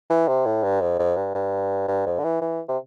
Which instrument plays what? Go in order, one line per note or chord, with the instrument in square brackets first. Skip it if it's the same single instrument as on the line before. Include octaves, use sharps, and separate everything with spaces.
[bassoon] E3
C3
A2
G2
F2
F2
G2
G2
G2
F2
D3
E3
E3
C3